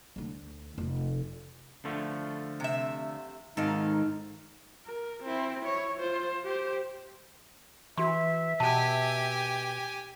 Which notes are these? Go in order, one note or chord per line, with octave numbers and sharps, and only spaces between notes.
D2 D3
F1 F4
D3 F3 A3
C3 E5
G#2 D#3 D#4 A4 D#5 F5
A#4
C4 E4
E4 C#5
F4 C5
G4 C5
E3 F#4 E5 C6
B2 G4 G#5 A5